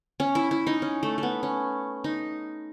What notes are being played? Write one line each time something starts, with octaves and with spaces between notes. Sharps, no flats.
C#4
E4
E4
D#4
C#4
A3
A3 B3
C#4
D#4